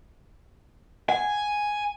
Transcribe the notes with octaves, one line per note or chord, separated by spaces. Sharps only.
F#5 G#5